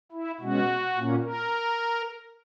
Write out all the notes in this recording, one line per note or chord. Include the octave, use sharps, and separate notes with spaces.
E4
B2 G#3 C#4 F#4
A#2 A#3 C#4
A#4